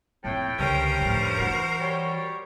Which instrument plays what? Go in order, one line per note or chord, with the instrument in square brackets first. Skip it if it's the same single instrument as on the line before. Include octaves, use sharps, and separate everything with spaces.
[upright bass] A#1 F2 [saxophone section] A2 [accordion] G5
[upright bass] C#2 D3 [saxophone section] G2 C#4 [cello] A#4 C5
[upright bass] F2 A2
[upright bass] E3 [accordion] F#4
[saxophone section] G3 G4 C#5